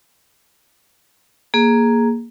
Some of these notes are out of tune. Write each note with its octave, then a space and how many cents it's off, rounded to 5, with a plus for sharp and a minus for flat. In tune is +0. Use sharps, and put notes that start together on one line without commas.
A#3 +0 G#4 +0